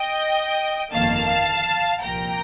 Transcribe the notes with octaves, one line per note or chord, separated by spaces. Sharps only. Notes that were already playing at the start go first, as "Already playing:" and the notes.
Already playing: D#5 G5
G1 F2 D#3 A#3 F5 A5
C2 A#2 F3 A#3 G5 A#5